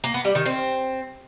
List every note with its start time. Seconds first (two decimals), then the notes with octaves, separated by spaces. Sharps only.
0.04 A#3
0.14 B3
0.25 G3
0.35 D#3
0.46 C4